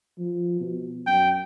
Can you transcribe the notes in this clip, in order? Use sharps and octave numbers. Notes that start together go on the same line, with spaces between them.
F3
B2
F#2 G5